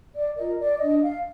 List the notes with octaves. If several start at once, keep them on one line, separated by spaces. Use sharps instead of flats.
D5
F4 A#4 D#5
D5
D4 D#5
F5